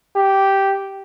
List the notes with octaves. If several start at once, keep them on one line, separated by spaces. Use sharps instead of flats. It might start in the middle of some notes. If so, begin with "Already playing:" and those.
G4